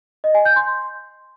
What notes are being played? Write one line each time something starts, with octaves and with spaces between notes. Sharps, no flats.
D#5
G#5
G6
C6